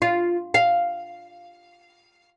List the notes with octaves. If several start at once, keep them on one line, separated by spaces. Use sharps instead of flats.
F4
F5